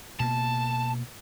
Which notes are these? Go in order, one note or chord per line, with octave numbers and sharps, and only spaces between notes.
B2 A#3 A5